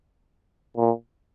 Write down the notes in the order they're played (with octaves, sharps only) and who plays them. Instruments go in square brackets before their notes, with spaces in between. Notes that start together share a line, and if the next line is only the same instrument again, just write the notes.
[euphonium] A#2